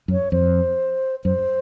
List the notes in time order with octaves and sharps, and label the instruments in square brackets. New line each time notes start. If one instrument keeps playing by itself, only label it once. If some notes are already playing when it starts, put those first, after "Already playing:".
[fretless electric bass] F#2
[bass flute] C#5
[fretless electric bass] F2 [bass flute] C5
[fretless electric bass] F#2 [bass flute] C5